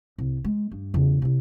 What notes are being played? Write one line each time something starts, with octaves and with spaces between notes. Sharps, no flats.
C2
G#3
G2
E2 C#3
C3 E4